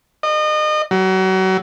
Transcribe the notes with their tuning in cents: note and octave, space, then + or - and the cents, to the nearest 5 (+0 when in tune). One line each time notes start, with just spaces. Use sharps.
D#5 -30
F#3 +30